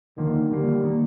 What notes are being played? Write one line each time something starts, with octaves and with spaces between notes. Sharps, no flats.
D#2 D3 D#3 F3 A#3
D#2 D3 F3 G3 A#3
D#3 A#3 D#4